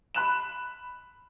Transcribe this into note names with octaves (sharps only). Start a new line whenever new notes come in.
B5 F#6 E7